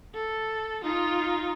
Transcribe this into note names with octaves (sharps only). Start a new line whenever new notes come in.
A4
D#4 F4